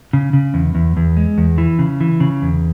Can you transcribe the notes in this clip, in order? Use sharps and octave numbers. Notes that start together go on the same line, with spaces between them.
C#3
C#3
E2
E2
E2
G#3
E2
E3
C#3
E3
C#3
E2